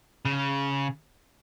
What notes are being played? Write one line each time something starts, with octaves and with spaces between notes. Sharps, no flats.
C#3